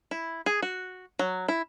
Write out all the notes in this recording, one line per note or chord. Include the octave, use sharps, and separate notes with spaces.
E4
G#4
F#4
F#3
E4